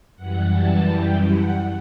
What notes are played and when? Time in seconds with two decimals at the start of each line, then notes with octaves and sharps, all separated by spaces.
0.16 F#2 E3 G3 F#5
0.53 A5
0.89 G5
1.27 F#5